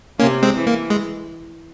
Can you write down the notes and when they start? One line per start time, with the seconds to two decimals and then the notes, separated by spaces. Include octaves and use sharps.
0.19 C3 A#3 C#4
0.43 G#3 C4
0.55 E3
0.67 A#3
0.90 G#3